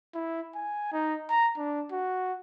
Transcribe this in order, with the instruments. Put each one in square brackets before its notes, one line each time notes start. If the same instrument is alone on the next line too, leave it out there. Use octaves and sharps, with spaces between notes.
[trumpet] E4
G#5
D#4
A#5
D4
F#4